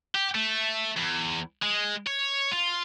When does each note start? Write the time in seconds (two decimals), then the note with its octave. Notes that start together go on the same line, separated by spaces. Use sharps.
0.15 G4
0.35 A3
0.97 E2
1.62 G#3
2.06 C#5
2.52 F4